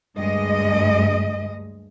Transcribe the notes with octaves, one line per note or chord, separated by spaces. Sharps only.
D2 G2 G#3 D#5